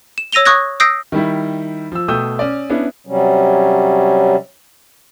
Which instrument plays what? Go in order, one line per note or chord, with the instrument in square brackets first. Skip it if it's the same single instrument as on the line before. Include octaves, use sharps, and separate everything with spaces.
[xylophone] E7
C#5 E6 A#6 D#7 F7 G7
C#6 D#6 F#6 G#6 A#6
D#6 E6 G6 A#6 C7 D7
[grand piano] D#3 G3 E4
F3 E6
B2 A3 G5 D#6 E6 G6
C#4 D5
B3 C#4 D4 E4
[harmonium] C3 F#3 G3 C#4